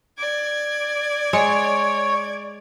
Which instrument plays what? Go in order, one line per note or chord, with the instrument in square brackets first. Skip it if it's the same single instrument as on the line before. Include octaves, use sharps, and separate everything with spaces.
[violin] D5 G#6
[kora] G#3 [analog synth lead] C#5